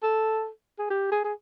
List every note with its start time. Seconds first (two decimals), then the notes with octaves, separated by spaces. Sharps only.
0.03 A4
0.79 G#4
0.90 G4
1.11 G#4
1.24 G#4